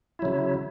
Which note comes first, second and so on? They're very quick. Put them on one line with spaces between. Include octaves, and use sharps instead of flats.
E4 F#3 C#3